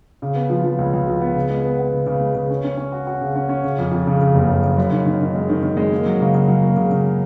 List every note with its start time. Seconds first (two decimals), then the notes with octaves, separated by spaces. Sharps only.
0.22 C#3
0.35 B3
0.50 F3
0.64 F3
0.78 C#2
0.93 C#2
1.08 F3
1.21 B3
1.35 C#3
1.50 G#3
1.64 B3
1.79 B3
1.93 C#3
2.06 C#3
2.21 G#3
2.35 C#3
2.50 C#4
2.64 C#4
2.78 C#4
2.92 F#4
3.07 F#4
3.21 C#3
3.35 C#4
3.49 C#4
3.64 C#3
3.78 F2
3.92 F2
4.07 C#3
4.21 C#3
4.34 F#1
4.49 F#1
4.64 C#3
4.77 F#2
4.92 D#3
5.06 D#3
5.21 D#3
5.35 G#3
5.49 D#3
5.63 D#3
5.77 G#3
5.92 A#3
6.06 F#3
6.21 C#3
6.34 C#3
6.48 F#3
6.63 A#3
6.76 C#3
6.91 C#3